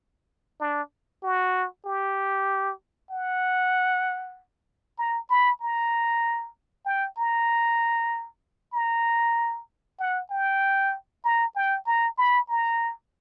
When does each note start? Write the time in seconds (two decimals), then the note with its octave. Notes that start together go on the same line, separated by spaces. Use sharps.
0.60 D4
1.23 F#4
1.85 G4
3.11 F#5
4.98 A#5
5.30 B5
5.61 A#5
6.86 G5
7.18 A#5
8.74 A#5
9.99 F#5
10.30 G5
11.24 A#5
11.56 G5
11.86 A#5
12.18 B5
12.49 A#5